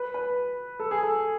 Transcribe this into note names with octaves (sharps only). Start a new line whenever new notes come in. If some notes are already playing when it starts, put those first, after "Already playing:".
Already playing: B4
B4
A4
G#4
A4